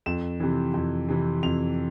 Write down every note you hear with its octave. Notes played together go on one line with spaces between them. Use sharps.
F2 E7
C3 E3
F2
C3 E3
F2 F7